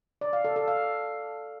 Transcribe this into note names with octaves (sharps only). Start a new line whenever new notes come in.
D5
F5
A4
A4
F5